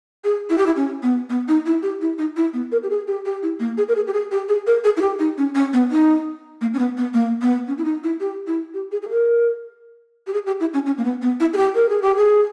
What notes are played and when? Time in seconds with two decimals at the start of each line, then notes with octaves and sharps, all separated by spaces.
0.24 G#4
0.50 E4
0.58 G4
0.66 E4
0.76 C#4
1.03 B3
1.29 B3
1.48 D#4
1.66 E4
1.83 G4
2.01 E4
2.18 D#4
2.37 E4
2.53 B3
2.72 A#4
2.83 G4
2.90 G#4
3.07 G4
3.25 G4
3.43 E4
3.60 A#3
3.78 G#4
3.89 A#4
3.96 G#4
4.07 G4
4.13 G#4
4.31 G4
4.49 G#4
4.67 A#4
4.84 G#4
4.97 E4
5.01 G4
5.19 D#4
5.38 C#4
5.55 C#4
5.73 B3
5.91 D#4
6.61 A#3
6.73 C#4
6.79 B3
6.97 B3
7.14 A#3
7.42 B3
7.68 C#4
7.78 E4
7.85 D#4
8.04 E4
8.20 G4
8.47 E4
8.74 G4
8.92 G#4
9.02 G#4
9.10 A#4
10.27 G4
10.34 G#4
10.46 G4
10.60 E4
10.74 C#4
10.86 C#4
10.98 A#3
11.05 B3
11.22 B3
11.40 E4
11.53 G#4
11.57 G4
11.75 A#4
11.89 G#4
12.02 G4
12.16 G#4